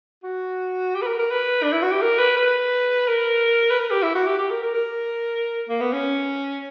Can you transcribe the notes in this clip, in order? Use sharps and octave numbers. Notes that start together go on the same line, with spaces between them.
F#4
G4
B4
A#4
A#4
B4
D4
E4
F#4
G4
A#4
B4
B4
A#4
B4
A#4
G4
E4
F#4
G4
G4
A#4
A#4
A#4
A#3
B3
C#4